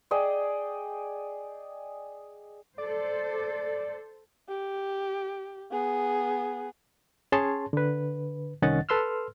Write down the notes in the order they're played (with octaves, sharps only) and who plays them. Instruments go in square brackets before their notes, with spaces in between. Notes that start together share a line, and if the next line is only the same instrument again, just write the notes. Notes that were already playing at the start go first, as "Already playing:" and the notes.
[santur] G#4 D5 D#5 G5
[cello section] A4 C5 [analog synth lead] D5
[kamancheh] G4
B3 G#4
[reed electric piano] C#4 G#4 C#5 A5 C6
D3 B4
C2 D#3 C#4 D#5 F#5 A6
A4 B4 C6 E6 F6